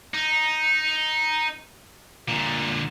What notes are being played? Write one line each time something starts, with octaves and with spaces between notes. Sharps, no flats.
D#4
A#2 D3